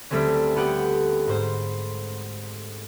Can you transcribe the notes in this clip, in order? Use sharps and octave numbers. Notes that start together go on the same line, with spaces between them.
D2 G3 A3 C4 C#4
B3 G4 F#5 G5
G#2 C5